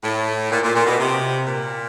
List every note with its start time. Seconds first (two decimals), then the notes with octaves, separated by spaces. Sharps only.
0.03 A2
0.51 A#2
0.63 A#2
0.74 A#2
0.86 B2
0.99 C3
1.46 A#2